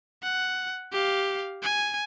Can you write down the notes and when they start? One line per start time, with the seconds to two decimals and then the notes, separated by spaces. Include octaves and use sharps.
0.23 F#5
0.92 G4 F5
1.62 G#5